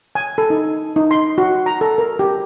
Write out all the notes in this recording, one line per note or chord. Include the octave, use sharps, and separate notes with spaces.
G#5
A4
D#4
D#4
C6
F#4
A#5
A4
A#4
G4